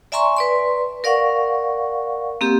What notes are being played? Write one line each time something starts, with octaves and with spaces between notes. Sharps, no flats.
D5 E5 G#5 A#5 C6 C#6
B4 D5 C6
A#4 D5 F5 F#5 C#6
A#3 C4 G4